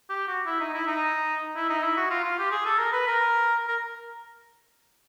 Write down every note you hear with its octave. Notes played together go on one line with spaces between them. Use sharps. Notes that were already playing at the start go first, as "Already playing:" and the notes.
G4
F#4
E4
D#4
E4
D#4
E4
D#4
E4
F#4
F4
F4
G4
G#4
A4
A#4
B4
A#4
A#4